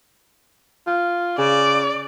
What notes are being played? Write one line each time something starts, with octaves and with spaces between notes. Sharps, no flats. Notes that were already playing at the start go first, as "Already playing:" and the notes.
F4
C#3 D5